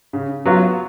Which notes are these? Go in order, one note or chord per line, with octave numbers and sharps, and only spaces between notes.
C#3
F#3 B3 F4